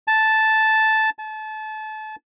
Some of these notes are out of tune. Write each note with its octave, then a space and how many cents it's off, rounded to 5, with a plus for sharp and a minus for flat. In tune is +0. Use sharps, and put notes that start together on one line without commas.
A5 -5
A5 -30